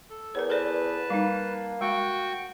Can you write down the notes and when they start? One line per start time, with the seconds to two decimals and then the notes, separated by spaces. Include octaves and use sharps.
0.10 A4
0.35 E2 A#4 C#5
0.50 A4 B4 C5 D5 A5
1.10 G3 A#3 D#4
1.81 G#3 F#4 G5 C#6